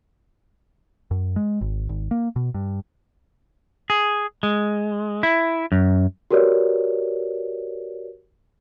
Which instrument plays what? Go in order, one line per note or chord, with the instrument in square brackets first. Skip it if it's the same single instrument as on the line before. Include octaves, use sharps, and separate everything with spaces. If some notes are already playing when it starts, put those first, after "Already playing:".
[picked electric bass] F#2
G#3
G#1
G#1
A#3
B2
G2
[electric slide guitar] G#4
G#3
E4
F#2
[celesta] F#4 G4 A#4 B4 C#5 D5